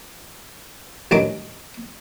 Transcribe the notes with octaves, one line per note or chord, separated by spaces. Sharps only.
A1 G2 D#3 F#3 D6